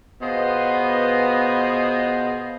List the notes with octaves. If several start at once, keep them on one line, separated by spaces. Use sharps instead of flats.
B2 B3 F4 G#4 C5 D#5